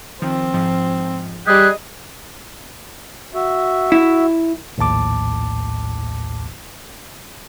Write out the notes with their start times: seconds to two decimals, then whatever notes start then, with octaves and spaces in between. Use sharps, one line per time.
0.22 D#3 F3 C4
0.54 G#2 F3
1.47 G3 G4 G#4 D#5 F#6
3.34 F#4 E5
3.92 E4
4.78 A#1 D#2 A2 A5 D6